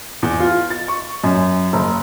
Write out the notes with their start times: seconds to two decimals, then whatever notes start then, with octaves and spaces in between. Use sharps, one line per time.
0.23 E2
0.40 F4
0.70 A6
0.88 C#6
1.24 F#2
1.73 F#1